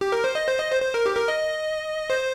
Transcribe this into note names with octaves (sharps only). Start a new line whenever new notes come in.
G4
A#4
C5
D#5
C5
D#5
C5
C5
A#4
G4
A#4
D#5
C5